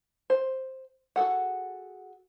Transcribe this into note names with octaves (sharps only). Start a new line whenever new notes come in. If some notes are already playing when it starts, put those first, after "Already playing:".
C5
F#4 G#4 A4 F#5